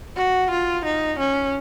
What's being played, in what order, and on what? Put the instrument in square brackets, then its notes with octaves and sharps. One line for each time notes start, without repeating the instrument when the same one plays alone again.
[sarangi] F#4
F4
D#4
C#4